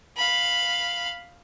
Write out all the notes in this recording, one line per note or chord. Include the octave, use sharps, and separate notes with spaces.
F5 B5